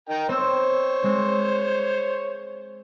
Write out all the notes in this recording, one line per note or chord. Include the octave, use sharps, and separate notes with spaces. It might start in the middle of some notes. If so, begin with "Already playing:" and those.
D#4 A#4 G5
C4 C5 C#5 E6
G#3 C4